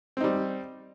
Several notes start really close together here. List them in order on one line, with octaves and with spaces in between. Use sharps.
C4 D#4 G3